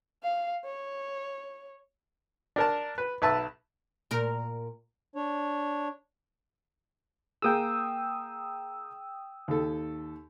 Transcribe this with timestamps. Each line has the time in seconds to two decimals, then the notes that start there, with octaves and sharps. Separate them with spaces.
0.23 F5
0.65 C#5
2.56 D4 A#4 A5
2.98 B4
3.22 B1 B4 E5 A5
4.11 A#2 A#4
5.16 D4 C#5
7.42 A#3 G#4 G5 D#6 E6
9.48 D#2 A4